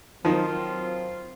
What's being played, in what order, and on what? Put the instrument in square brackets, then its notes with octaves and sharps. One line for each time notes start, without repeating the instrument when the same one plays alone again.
[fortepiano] D#3 F3 [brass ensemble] F#3 C4 F4